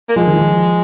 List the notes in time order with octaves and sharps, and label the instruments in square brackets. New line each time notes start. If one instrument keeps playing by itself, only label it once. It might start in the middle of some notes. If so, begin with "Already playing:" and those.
[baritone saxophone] A#3
[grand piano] F3 [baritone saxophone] G#3
[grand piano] D#3
F3